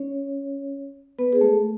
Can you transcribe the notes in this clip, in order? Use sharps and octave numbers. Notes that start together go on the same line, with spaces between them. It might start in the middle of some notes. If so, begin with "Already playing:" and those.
Already playing: C#4 C#5
B3 B4
G#4
A3 A4